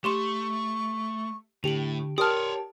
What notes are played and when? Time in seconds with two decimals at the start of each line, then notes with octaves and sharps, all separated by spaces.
0.04 A3 G4 C6 C#6 E7
1.64 A2 D3 G4 F7 F#7
2.18 G4 A#4 C#5 D5 A5 C6 D#6 F6